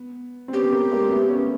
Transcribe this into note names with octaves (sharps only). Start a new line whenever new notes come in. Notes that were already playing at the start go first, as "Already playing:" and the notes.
Already playing: B3
C4
B3 C#4 G4
B3
A#3 C4
G#3 A#3
A3 B3
B3 C#4